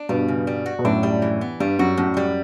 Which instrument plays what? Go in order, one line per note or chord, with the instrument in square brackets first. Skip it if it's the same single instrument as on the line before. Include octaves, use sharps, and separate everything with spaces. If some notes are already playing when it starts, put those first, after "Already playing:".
Already playing: [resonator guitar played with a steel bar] D4
[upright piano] G2 B2 [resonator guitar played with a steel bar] G3
[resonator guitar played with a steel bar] C#3
G3
F#4
[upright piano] B2
[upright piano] F#2 A2 [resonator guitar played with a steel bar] D4
[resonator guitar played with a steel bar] G3
E3
B3
[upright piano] G2 [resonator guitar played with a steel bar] G3
[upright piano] F#2 [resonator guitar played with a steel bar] F#4
[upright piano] F#2 [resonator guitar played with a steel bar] A2
[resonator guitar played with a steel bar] G3